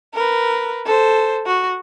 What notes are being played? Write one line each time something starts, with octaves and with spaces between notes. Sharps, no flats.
A#4 B4
A4 C5
F#4